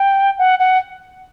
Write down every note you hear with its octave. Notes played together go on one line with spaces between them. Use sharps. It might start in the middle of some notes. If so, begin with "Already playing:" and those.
Already playing: G5
F#5
F#5